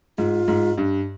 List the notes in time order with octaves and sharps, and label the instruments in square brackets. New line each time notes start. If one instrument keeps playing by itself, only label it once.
[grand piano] G#2 [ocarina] F4
[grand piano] G#2
G2